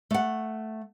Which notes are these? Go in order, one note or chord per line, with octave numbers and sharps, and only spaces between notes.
A3 F#5